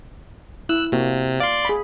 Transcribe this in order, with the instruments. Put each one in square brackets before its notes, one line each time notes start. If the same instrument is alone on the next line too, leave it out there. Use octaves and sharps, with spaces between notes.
[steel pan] E4 [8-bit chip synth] E6 F#6
[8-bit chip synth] C3 [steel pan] A#3 F#4
[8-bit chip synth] D5 C6 [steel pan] F5
[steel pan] G#4 B5